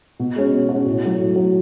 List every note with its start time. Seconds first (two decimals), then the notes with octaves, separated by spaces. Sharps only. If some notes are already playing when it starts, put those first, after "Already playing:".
0.20 B2
0.36 G#3 C#4 F#4
0.52 B2
0.69 G#3 C#4 F#4
0.85 A2
1.03 F#3 A3
1.19 A2
1.36 F#3 A3